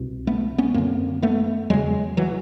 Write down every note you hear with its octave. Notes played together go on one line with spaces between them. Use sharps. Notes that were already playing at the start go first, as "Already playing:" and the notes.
Already playing: C2 B2
A3 B3
B3 C#4
F#2 D3 A#3 C4
A3 B3
E2 C#3 F#3 G#3
E3 F#3